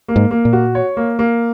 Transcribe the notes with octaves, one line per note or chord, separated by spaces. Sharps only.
A#3
G#2
A#3
A#2
F#4
C#5
A#3
A#3